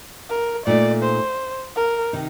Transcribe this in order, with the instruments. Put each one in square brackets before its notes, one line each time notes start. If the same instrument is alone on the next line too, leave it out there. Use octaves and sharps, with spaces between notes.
[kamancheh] A#4
[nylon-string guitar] A#2 A3 D#4 [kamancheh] D5
[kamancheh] C5
A#4
[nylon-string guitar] C3 D#3 D#4